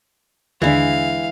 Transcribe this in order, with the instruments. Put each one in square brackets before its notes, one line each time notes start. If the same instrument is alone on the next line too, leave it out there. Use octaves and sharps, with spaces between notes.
[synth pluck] D#2 D3 D4 [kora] E3 [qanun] G#3 E4 [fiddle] F5